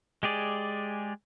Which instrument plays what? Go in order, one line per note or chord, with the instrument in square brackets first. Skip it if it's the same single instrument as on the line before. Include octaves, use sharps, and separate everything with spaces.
[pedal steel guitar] G#3 G4 G#4 D5